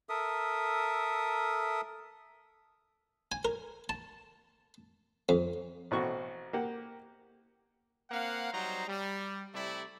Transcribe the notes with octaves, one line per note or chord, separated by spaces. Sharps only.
A4 A#4 E5 D#6
G#5
A#4
A5
F2
A1 B2 C4 F#4 C#6
A#3 G4 F#5
A#3 C4 F5 F#5
F#3 G3 D#4 C5 A#5
G3
C3 G3 A3 E4 D5